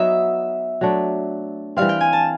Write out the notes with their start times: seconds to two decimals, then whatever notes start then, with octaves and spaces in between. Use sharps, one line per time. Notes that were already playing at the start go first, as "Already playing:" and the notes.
Already playing: F#3 B3 D#4 E5
0.81 F#3 A3 D4
1.77 E3 G3 C4 F5
1.89 G5
2.00 G#5
2.13 A5